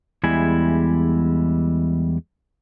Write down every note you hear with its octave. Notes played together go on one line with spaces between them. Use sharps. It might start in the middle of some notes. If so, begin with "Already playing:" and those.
E2 G3 G#3 E4 G#5